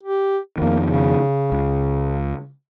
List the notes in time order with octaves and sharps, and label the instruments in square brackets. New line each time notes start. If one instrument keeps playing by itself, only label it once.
[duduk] G4
[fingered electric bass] F2 D#3 [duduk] A#3
[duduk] C#3
[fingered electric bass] C#2